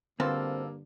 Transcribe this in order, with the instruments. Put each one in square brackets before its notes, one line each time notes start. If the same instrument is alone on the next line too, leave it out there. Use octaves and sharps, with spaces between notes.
[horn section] G2 G3 A#3 [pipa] B2 F4 A4 [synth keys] D3 [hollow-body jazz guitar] C4